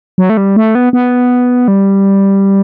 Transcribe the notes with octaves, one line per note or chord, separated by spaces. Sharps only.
F#3
A3
G3
A3
B3
B3
G3